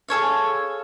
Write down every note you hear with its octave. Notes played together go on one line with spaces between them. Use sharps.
G#4 A4 C#5 F5